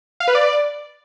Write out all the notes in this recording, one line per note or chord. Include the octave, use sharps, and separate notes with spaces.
F5
B4
D5